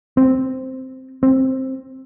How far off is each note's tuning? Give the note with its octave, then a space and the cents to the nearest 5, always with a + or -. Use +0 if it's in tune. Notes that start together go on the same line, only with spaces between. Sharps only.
C4 -5
C4 +10